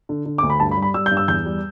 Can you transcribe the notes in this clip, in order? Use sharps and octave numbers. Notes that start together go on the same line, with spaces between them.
D3
D3
D2 D6
B5
G2 A5
B5
G3
B5
G3 E6
G6
G2
E6
E2 G6
G3